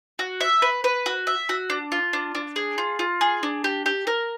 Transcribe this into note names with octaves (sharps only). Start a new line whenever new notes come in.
F#4
E5
B4
B4
F#4
E5
F#4
D4
F4
D4
D4
G#4
F4
F4
G#4
D4
G4
G4
A#4